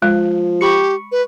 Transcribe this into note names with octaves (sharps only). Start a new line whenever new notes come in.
F3 G#3
G4 B5 C#6 C#7
B4